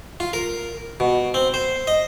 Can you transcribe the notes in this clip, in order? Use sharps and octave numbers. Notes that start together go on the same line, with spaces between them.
F4
A#4
B2
C4
C5
D#5